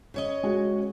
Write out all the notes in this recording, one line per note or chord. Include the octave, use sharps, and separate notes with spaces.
C#3 C#5 D#5
G#3 F#4